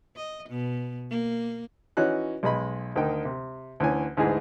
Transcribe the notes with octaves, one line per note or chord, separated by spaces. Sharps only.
D#5
B2
A#3
E3 C#4 D#4 F#4 F#6
B1 G#3 D#5 B5
D2 D#3 G5
C3
D2 E3 C#4 G#5
D2 G#2 E3 G#4